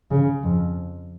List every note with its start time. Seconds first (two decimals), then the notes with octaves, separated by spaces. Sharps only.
0.11 C#3
0.43 F2